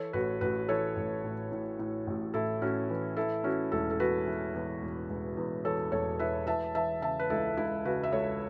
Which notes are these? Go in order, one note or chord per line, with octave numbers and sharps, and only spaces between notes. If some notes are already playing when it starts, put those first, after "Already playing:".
Already playing: E3 A4 C#5
A1 F#4 B4
A1 F#4 B4
E3 A4 C#5
A1
A2
A2
A2
A1
A2 E4 A4
A2 C#4 F#4
E3
E3 E4 A4
E3 C#4 F#4
E1 E4 A4
A4
E2 F#4 B4
E3
E2
E1
E1
E2
E3 A4 C#5
E1 A4 C#5
E3 B4 E5
E3 E5 A5
E3 E5 A5
C#3 E5 A5
B4
C#2 E4 A4
C#2 E4
C#3 F#4 B4
E5
C#2 A4 C#5